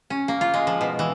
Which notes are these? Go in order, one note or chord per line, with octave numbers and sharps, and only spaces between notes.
C#4
A#3
F4
G#3
F3
B2
E3